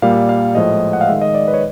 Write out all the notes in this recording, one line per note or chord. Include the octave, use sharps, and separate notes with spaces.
A#2 G3 A#3 F5
F5
A2 F3 G#3 D#5
F#5
F5
D#3 G#3 E5
D#5
D5
B4
C#5